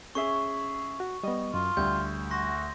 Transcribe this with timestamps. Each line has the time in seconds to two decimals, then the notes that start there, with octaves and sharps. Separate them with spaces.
0.15 C#4 G#4 E5 C#6
1.00 F#4
1.24 G3 B3 D#5
1.54 F#2 F4
1.77 D2 G3 G6
2.31 F#4 C6 A#6